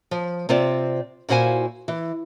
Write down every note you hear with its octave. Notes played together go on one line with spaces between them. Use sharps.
F3
C3 C4 F4 C5 D5
A#2 E4 F#4 C5 F5 G#5
E3